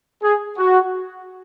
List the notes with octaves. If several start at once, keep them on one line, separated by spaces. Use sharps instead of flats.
G#4
F#4